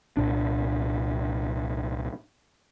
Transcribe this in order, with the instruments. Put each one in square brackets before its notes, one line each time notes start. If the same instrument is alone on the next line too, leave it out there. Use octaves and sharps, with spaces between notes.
[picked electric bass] C2 A#2 D4